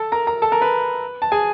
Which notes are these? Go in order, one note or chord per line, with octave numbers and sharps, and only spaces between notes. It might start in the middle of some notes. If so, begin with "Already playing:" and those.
Already playing: A4 A5
A#4 A#5
A#4 A#5
A4 A5
A#4 A#5
B4 B5
A5
G#4 G#5